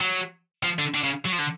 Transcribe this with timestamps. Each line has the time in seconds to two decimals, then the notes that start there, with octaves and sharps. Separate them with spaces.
0.01 F#3
0.63 F3
0.79 D3
0.94 D3
1.04 C#3
1.25 F#3
1.32 F3
1.39 D3